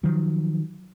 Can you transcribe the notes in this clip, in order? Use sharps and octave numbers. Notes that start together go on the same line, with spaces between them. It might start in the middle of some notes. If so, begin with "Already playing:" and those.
D#3 F3 F#3